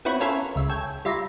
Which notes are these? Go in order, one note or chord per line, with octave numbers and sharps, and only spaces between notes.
B3 C4 E4 F#4 B4 C#5
C#4 E4 F4 A4 A#4 C#5
C#2 E5
A4 C#5 G5 G#5 G#6
G3 F4 E5 A#5 B5